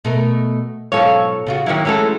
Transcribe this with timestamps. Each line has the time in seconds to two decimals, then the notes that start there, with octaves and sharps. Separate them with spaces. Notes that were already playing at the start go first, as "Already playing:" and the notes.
0.05 B2 A3 A#4
0.92 G#2 B2 F#3 F4 A4 C#5
1.47 C#3 F4 F#4
1.66 D#3 F#3 A#3 E4 C#5
1.85 E3 F#3 G#3 A3 C#4 A4